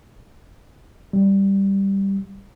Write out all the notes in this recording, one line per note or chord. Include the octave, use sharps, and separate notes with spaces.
G3